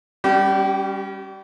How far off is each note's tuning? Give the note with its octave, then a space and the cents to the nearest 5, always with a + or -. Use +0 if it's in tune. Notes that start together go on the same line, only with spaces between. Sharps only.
G3 +10 C#4 +0 G4 -35